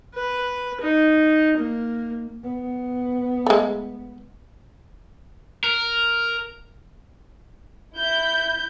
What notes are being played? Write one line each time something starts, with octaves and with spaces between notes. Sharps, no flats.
B4
D#4
A#3
B3
G#3 A3
A#4
E4 G6